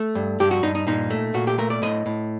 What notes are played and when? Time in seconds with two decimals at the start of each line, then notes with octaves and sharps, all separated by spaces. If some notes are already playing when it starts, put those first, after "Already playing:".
Already playing: A3
0.15 G2
0.40 G2 G4
0.51 F#4
0.63 G2 D#4
0.75 D#4
0.87 A#2 D#4
1.10 A3
1.34 A#2 F#4
1.47 G4
1.58 A3 A#4
1.70 D5
1.82 A2 D#5
2.06 A2